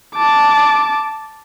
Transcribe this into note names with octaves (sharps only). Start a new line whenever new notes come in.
A5 D6